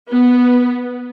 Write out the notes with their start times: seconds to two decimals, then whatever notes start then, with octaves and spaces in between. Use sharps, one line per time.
0.10 B3